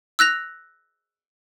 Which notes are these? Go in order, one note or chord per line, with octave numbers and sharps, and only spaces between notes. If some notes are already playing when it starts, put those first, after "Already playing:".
E6 F#6 A#6 F7